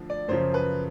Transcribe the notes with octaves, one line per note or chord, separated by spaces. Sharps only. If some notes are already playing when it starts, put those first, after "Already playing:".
Already playing: D2 D3 F3
D5
F#2 C#3 F3 C5
B4